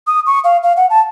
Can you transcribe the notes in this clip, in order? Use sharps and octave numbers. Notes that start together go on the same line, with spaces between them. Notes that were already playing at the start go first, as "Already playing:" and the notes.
D#6
C#6
F5
F5
F#5
A5